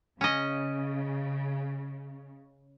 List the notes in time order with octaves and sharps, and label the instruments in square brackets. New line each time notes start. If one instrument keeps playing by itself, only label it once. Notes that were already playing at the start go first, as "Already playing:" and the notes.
[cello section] C#3 [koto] C#4 D#5